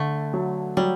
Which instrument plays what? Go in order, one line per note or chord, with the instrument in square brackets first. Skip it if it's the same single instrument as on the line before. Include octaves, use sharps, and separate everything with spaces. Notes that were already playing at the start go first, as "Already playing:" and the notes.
Already playing: [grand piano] D3 [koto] A3
[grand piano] F#3
[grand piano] F#3 [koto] G3